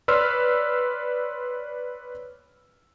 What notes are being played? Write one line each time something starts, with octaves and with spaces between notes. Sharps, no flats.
B4 C#5 D5 C6 E6 F6